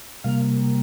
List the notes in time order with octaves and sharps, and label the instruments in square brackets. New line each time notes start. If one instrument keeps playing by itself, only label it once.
[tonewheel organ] C3 G3 A#3 F5